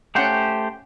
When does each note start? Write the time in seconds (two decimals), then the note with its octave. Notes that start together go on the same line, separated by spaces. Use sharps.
0.15 A3 C#4 G4 C5 F#5 G5